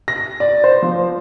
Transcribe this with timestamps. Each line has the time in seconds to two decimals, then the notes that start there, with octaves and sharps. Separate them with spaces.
0.08 A#6
0.40 D5
0.64 C5
0.82 F3